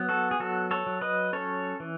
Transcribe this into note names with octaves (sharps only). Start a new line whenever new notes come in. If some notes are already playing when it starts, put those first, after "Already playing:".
Already playing: F#3 B3
F#4 A4
G#4
F#3 F#4 A4
A4 C#5
F#3
B4 D#5
C#4 A4 C#5
E3